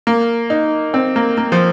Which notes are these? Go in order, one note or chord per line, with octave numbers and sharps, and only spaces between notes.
A#3
D#4
C4
A#3
A#3
F3